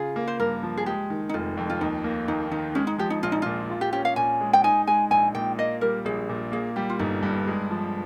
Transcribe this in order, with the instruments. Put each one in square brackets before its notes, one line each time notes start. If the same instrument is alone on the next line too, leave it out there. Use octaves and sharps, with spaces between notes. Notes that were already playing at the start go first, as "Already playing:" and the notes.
Already playing: [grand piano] C#3 F4 [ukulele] G#4
[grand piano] A#3
[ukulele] C5
[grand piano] G2 [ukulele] A#4
[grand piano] F3
[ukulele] G#4
[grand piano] G#3 [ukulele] G4
[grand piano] D#3
[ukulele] D#4
[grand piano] F1 [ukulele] F4
[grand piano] F2
[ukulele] F4
[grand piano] D#2 [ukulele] D#4
[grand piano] A#3
[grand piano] D#2 [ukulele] D#4
[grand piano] D#3 [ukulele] D#4
[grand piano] G#3 [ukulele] C#4
[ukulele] D#4
[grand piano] F3 [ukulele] G4
[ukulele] D#4
[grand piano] A#1 [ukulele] F4
[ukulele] D#4
[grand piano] A#2 [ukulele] F4
[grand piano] F4
[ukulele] G4
[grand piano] C#4 [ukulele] G4
[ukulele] F5
[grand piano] A#2 [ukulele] G#5
[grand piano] G#3
[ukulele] G5
[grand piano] D#4 [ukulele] G#5
[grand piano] G#3 [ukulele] G#5
[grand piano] A#1 [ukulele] G#5
[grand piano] A#2 [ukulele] G5
[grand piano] A#3 [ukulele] D#5
[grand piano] G3 [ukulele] A#4
[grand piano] A#1 [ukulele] G#4
[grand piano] A#2
[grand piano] A#3 [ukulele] G#4
[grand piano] G3 [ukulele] G4
[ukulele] F4
[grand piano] G1 [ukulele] D#4
[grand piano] G2
G#3
F3